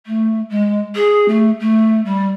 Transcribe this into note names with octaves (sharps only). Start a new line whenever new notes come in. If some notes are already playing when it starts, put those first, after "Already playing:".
A3
G#3
G#4
A3
A3
G3